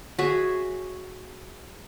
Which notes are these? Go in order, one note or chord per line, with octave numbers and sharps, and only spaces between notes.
F#4 G#4 C#5 E5